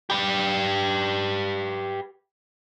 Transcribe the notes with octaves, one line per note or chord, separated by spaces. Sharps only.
G4 B4